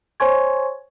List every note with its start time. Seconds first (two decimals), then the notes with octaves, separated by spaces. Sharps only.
0.20 C5 C#5 G#5 C6 C#6 G#6